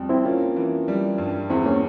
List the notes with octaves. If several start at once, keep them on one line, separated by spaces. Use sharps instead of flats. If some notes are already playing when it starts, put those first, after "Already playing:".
Already playing: F2 G3
C4 E4
A#3 C#4 F4
E3
G3
G2
E2 C4 E4
A#3 C#4